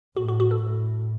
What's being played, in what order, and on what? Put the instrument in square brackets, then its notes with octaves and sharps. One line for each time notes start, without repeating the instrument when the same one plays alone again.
[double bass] A2 [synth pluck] F#4
[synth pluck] F#4
F#4
A4
[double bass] A2